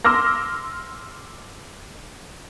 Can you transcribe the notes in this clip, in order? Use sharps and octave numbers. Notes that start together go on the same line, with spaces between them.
C6 D6 E6 F6 A#6